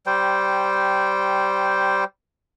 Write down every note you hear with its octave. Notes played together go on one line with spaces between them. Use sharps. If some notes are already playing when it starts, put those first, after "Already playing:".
G3 C5 G5